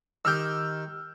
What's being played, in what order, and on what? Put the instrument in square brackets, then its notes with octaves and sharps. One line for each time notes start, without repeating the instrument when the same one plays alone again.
[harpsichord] D#3 G4 [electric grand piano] E6 F6 G6